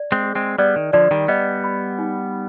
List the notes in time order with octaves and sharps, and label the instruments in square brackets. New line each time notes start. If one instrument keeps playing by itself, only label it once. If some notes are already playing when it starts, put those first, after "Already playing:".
Already playing: [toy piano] D5
[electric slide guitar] G#3 C4
[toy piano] G#4
[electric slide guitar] G#3 C4
[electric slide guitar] G3 B3 [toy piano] D5
[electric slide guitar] D#3
[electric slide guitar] D3 F3 [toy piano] D5
[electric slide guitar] D#3 G3
[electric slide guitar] G3 B3 [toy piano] D#5
[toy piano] B5
D#4